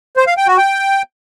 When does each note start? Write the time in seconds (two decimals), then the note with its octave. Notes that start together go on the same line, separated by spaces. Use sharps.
0.17 C5
0.27 F5
0.37 G5
0.47 F#4
0.58 G5